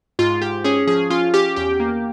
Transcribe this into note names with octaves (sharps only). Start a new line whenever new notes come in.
G#2 F4
G#2 G4
C#4 G#4
F3 G#4
C#4 F4
C#4 G4
E2 G4
A#3